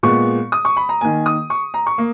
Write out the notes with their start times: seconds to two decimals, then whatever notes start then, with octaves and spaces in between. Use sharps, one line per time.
0.03 A#2 G#3 B3 C#6
0.52 D#6
0.65 C#6
0.77 B5
0.89 A#5
1.01 D#3 A#3 G#5
1.26 D#6
1.50 C#6
1.74 A#5
1.87 C#6
1.98 A#3